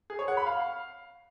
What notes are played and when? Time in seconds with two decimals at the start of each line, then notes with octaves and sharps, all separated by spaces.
0.10 G#4
0.19 C#5
0.28 F#5
0.37 B5
0.46 F5